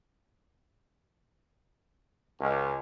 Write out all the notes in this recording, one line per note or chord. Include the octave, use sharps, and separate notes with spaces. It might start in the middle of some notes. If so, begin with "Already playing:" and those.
C#2